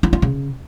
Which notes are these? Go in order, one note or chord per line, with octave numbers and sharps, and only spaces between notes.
E4
F4
C#3